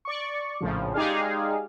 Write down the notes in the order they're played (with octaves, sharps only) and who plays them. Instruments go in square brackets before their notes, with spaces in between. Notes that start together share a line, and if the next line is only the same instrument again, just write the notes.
[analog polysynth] D5 C#6
A#1 A2 C#3 F3
G#3 D#4 G4 G#4 D5 F5